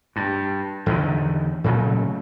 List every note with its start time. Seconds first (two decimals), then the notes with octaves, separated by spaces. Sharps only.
0.16 G2
0.86 E2 D3 D#3
1.64 A#2 C#3 F#3 A3